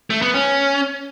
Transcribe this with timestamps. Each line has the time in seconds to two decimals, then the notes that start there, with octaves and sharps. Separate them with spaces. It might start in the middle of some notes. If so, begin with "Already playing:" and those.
0.10 A3
0.22 B3
0.34 C#4